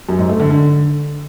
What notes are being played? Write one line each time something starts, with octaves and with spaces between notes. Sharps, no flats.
F#2
G#2
A3
D3
D3